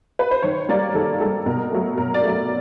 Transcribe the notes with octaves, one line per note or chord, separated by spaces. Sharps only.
B4
C5
D#3 C#5
G3 A#3 D5
D#3 A4
G3 A#3 A4
B2 A#4
F#3 A3
B2 A#4
D5
F#3 A3